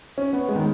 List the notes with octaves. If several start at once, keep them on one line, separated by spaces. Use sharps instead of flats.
C#4
B3
G#3
D#3